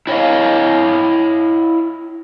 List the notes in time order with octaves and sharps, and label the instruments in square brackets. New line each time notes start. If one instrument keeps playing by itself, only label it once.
[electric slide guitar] E4 C#5 D#5 F5